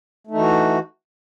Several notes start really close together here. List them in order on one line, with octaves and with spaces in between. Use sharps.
A3 D#4 E3 F#4